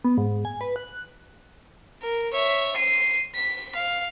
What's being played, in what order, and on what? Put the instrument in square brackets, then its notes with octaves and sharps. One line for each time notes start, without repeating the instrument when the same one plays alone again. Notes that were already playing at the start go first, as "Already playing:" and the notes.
[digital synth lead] B3
G#2
G#5
B4
F#6
[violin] A#4
C#5 E5
C7 D#7
B6
F5